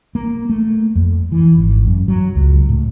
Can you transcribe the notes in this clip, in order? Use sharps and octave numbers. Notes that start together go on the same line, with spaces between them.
A#3
A3
F2
E3
G#1
F#2
F#3
C#2
A2